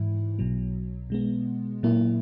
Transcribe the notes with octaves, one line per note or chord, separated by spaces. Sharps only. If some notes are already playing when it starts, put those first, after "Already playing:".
Already playing: G#2 E3 E4
B1 B2 F#3
B2 G#3 B3
A#2 F#3 A#3 E4